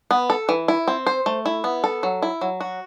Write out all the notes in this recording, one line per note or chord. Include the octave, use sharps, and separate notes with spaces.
B3
A4
E3
E4
C4
C5
A3
E4
B3
A4
F#3
E4
F#3
F#4